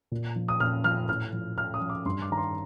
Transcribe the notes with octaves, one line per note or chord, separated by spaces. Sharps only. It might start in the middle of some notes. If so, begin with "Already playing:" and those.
A#2
F3
D#6
A#2 F6
F3 F6
A2 F6
F3
A2 F6
D#6
F3
D6
G2 C6
D6
D#3 A#5
C6